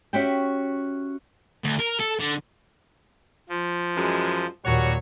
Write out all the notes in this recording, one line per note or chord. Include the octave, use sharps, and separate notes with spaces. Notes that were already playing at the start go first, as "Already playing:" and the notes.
C#4 F#4 G4 E5 G5
D2
A#4
A4
D3
F3
F#2 E3 G#3
D#2 A#2 F#3 G3 F#4 C#5